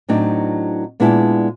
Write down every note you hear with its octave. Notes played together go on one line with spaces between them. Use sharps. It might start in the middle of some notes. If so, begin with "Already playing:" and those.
A2 F#3 C4 D4 D#4
A#2 G#3 B3 D4 E4 A5